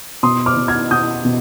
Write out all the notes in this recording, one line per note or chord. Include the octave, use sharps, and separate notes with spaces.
B2 C6 D#6
D6 F6
B2
F6 G#6
B2 D#6 G6
B2